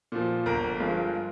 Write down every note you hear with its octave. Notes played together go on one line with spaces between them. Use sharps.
A#2 F3
G1 A#4
G2 F3 G#3